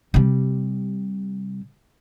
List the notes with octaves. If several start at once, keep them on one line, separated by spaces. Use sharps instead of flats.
C3 G3